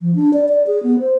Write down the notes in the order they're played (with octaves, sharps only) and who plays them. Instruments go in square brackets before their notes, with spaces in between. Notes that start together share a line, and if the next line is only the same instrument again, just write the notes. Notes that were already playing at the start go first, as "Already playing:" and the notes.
[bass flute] F3
D4
D5
D5
G#4
B3
C5